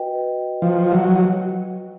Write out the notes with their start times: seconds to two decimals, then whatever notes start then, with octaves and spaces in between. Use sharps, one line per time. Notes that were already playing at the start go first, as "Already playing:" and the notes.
Already playing: F#4 B4 D#5 G5
0.62 F3
0.92 F#3